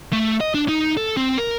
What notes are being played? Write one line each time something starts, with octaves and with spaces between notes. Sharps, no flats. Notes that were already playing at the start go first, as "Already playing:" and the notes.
A3
D#5
D4
D#4
A4
C4
A#4